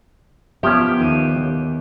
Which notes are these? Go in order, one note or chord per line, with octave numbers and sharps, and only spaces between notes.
F3 A#3 B3 C#4 G4 E5 G5
D#2 D#7